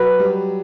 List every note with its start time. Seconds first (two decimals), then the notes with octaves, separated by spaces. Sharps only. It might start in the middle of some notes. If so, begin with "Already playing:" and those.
Already playing: F#3 B4
0.19 G3